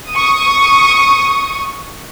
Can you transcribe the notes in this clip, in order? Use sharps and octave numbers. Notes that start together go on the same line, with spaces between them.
C#6 D#6